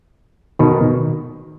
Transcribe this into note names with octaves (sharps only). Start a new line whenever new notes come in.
B2 D#3